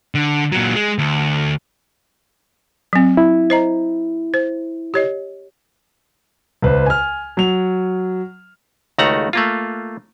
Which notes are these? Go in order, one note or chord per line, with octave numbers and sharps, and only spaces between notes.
D3
A#2 F#3
G#3
D2
F#3 C4
E4
C5 D#5 A#5
C5
G4 C#5 D#5
C#2 B4 C5
G#5 F6
F#3 F7
C#2 D#3 A3 F#4 F#5 A#5
A3 A#3 F4